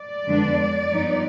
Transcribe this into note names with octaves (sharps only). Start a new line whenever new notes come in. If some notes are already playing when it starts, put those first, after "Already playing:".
Already playing: D5
F2 D3 G#3 B3 D4
G2 F3 B3 D#4